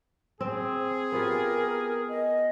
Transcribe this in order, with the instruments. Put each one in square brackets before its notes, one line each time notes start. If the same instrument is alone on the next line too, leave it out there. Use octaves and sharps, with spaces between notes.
[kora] C4 [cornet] G#4
[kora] B3 F4 G4 [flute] A#4
[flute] D#5